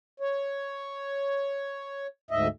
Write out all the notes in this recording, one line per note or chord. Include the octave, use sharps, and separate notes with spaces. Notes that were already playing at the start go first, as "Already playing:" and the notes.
C#5
D2 G#2 D#5 E5